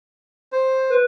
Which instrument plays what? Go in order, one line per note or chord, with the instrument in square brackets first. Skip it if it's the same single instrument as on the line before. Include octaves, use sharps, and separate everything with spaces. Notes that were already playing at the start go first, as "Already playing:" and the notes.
[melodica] C5
[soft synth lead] B4